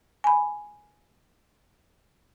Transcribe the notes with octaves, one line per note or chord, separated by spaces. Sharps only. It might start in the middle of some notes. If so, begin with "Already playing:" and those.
G#5 B5